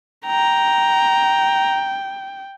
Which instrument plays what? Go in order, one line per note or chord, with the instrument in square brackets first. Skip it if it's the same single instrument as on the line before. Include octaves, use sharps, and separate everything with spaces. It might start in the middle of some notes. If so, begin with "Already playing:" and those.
[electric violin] G5 [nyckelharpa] A#5